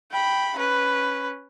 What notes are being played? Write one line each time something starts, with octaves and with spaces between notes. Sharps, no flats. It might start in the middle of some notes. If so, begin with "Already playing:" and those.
G5 B5
C#4 B4